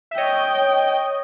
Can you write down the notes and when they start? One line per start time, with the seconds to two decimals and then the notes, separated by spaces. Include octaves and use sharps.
0.11 E5
0.17 C#5 D#5 G5